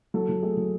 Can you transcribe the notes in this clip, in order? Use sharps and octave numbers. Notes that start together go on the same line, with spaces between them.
F#3 A4
F#3
A3 G#4
F#3